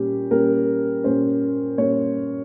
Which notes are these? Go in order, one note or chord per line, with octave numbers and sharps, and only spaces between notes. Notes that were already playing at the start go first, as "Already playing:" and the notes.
Already playing: A#2 G3 C#4 G4
A#2 G3 C#4 A#4
A#2 G3 C#4 C5
A#2 G3 C#4 C#5